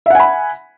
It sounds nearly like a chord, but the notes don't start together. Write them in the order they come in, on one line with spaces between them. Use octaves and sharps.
E5 F#5 G#5 B5